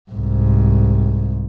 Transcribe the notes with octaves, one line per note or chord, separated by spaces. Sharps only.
C2 G#2